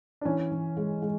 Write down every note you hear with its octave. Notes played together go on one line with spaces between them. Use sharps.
D4
E3 C#4
E3
G#3
G#3